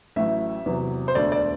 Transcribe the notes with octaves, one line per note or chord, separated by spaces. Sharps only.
A1 A2 F#3 E5
E2 C3 F#3
C5
E1 D2 D3 A3 D5
D5